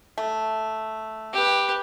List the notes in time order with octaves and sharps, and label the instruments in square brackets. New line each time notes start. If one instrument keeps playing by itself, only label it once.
[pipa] A3
[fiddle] G4 B4